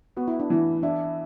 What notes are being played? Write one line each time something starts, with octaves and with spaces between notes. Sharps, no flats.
B3 F#4
E4
D4
E3 E4
D4 E4